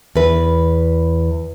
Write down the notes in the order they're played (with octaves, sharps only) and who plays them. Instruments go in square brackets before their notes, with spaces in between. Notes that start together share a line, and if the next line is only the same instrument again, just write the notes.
[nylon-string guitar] E2 B4